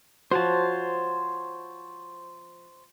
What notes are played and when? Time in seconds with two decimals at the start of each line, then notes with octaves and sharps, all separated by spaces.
0.32 F3 F#4 C5 C#5 A5